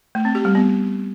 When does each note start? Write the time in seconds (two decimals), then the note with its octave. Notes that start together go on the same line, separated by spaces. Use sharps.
0.15 A3
0.25 C4
0.35 G4
0.45 G3
0.55 B3